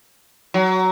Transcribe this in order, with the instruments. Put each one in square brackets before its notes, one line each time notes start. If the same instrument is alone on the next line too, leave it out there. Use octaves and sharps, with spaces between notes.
[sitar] F#3